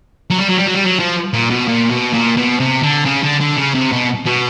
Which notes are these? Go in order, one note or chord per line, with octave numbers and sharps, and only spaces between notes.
F#3
G3
F#3
G3
F#3
G3
F#3
F3
A#2
B2
A#2
B2
A#2
B2
C3
D3
C#3
D3
D3
C#3
C3
B2
B2